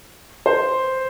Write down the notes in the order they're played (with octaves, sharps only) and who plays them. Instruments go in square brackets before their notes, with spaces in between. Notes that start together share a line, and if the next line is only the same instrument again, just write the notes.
[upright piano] C5